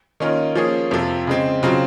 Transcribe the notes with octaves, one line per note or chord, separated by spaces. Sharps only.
D#3 A#3 C#4 F4 A#4
F3 A#3 C#4 G#4
F2 C3 F3
C#3 G#3 C4
C#3 F#3 C4 F4